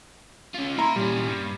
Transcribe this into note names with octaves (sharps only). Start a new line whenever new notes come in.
C#4 F4
A#3 E4 A#5 C6
A#2 G3 C#4
G2